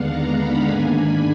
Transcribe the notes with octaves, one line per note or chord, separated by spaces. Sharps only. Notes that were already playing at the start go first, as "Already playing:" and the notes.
Already playing: D#2 D3 G#3 B3 D4 F5 F#5
A#5
B5
G#2 D#3 A#3 D4 G#5
B5